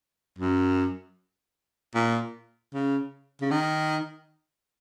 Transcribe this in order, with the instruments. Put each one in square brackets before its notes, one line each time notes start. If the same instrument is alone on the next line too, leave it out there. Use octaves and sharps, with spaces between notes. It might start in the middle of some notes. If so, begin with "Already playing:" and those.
[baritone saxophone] F#2
A#2
C#3
C#3
D#3